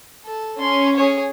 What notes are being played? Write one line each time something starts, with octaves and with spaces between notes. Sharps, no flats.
A4
C#4 C6
G#4 C#5